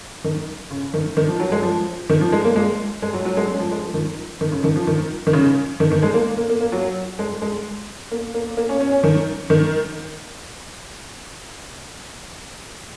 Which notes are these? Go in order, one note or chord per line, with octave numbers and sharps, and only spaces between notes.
D#3
C#3
D#3
D#3
F3
F#3
G#3
F3
D#3
F3
G#3
A#3
G#3
G#3
F#3
F#3
G#3
C#4
F3
G#3
F3
D#3
D#3
C#3
D#3
F3
D#3
D#3
C#3
D#3
D#3
G#3
A#3
A#3
A#3
A#3
F#3
G#3
G#3
A#3
A#3
A#3
C#4
C#4
C#4
D#3
D#3